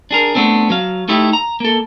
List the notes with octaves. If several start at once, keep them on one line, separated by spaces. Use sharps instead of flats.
D4 G#4 A#4
A3 B3 C4 D4
F#3 F5
A3 D#4 E4 G4
A#5
A#3 A4